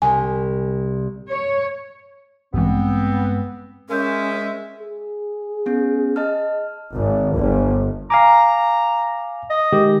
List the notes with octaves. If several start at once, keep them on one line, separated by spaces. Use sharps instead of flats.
C2 G#5
C#5
A1 G2 E3 G#3 B3 C4
G#3 C#4 A#4 E5 G6
G#4
B3 C#4
D#5 A5 F6
G#1
G1
F5 G#5 A#5 D6
D#5
D#3 G#3 G4